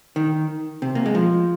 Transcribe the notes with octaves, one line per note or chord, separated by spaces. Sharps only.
D#3
C3
A#3
G#3
F3